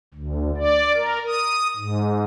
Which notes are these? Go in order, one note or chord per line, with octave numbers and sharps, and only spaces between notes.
D2
D5
A#4
D#6
G#2